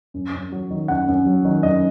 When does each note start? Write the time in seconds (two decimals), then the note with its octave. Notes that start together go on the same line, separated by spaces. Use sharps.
0.14 F#2
0.33 F#2
0.52 F#3
0.70 D#3
0.88 F#2 F#5
1.08 F#2
1.26 F#3
1.45 D#3
1.63 F#2 D#5